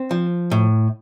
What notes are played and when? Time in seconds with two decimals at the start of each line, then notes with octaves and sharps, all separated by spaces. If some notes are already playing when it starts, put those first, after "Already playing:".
Already playing: C4
0.11 F3
0.51 A2